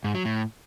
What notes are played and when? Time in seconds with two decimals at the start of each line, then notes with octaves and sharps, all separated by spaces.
0.04 G#2
0.15 F#3
0.25 A2